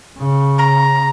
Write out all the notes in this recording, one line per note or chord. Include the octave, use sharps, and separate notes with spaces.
C#3
A#5